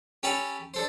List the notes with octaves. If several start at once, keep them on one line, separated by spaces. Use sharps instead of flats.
C#4 G4 A4 E5 A#5 B5
D4 A4 C5